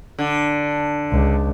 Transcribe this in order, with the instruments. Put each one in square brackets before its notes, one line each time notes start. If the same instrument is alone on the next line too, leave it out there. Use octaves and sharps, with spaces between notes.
[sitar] D3
[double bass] C#2